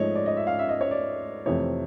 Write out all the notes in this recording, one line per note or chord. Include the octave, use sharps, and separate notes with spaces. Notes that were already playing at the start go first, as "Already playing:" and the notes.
Already playing: G#2 F3 A3 C#5 D#5
D5
D#5
E5
F5
E5
D#5
C#5
D5
F2 C3 E3 A3 C#5